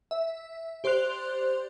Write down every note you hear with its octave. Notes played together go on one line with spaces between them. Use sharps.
E5
G4 C5 D5 C6 F#6 F7